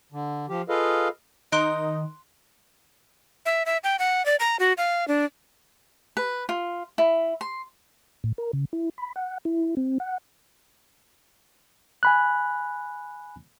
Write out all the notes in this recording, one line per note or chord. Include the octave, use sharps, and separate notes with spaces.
D3
F3 G4
F4 G#4 A4 B4 D#5 F5
D#3 D#4 D#5 C6 F#6 D7
E5
E5
G5
F#5
D5
A#5
F#4
F5
D4
B4
F4
E4
C6
A2
A#4
C#3
E4
B5
F#5
E4
C4
F#5
G#5 B5 F#6